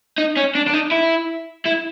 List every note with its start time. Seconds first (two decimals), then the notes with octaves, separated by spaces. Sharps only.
0.18 D#4
0.37 C#4
0.55 D4
0.67 D4
0.73 D#4
0.91 E4
1.65 E4